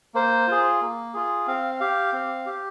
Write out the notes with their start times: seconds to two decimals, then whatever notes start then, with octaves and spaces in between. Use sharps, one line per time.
0.14 A#3 C5
0.48 F4 G#4
0.81 A#3
1.14 F4 G#4
1.47 C4 F5
1.80 G4 F5
2.13 C4
2.46 G4